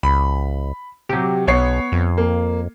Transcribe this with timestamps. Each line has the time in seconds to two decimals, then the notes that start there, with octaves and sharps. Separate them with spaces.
0.03 C#2 B5
1.09 C3 F#3 G4
1.47 B1 B3 C#5 C7
1.92 F2
2.18 A#3